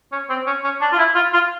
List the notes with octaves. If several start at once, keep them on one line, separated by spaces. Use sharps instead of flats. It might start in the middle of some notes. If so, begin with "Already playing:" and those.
C#4
C4
C#4
C#4
D4
F4
E4
F4
F4